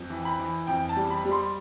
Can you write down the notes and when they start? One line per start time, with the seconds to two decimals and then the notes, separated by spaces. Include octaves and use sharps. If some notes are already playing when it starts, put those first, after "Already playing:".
Already playing: F2
0.10 E3
0.25 B5
0.39 E3
0.67 F2 G5
0.89 A5
0.96 G3
1.10 B5
1.25 G3
1.32 C6